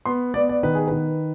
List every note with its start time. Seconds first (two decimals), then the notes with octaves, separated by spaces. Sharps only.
0.06 B3 C6
0.34 B3 D5
0.49 D5
0.63 D#3 B4
0.75 G#4
0.87 D#3 B4